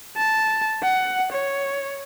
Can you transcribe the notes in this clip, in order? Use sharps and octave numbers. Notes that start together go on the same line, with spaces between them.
A5
F#5
C#5